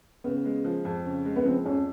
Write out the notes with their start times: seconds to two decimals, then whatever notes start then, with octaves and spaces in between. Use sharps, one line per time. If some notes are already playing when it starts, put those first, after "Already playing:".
0.24 C#3 B3
0.45 G#3
0.65 F3
0.85 F2
1.05 C#3
1.25 G#3
1.36 B3
1.45 F3 C4
1.66 F2 C#4